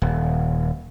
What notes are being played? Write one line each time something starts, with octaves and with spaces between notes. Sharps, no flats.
D#1